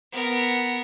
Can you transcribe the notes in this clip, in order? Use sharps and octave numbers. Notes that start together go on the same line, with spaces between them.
B3 A#4